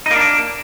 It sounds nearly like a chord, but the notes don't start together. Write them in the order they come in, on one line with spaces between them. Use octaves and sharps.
D#4 A#3 D4